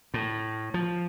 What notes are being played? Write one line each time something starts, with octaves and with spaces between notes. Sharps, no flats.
A2
F3